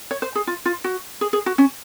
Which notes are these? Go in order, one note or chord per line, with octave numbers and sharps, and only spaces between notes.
C#5
C5
G#4
F4
F4
F#4
G#4
G#4
F#4
C#4